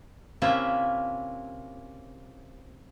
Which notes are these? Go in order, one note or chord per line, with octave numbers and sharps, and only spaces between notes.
C3 A#3 C#4 E4 F4 E5